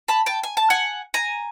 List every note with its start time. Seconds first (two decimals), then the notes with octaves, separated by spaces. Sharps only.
0.08 A5 B5
0.26 G5 A5
0.43 G#5
0.57 A5
0.70 F#5 G#5
1.14 G#5 A#5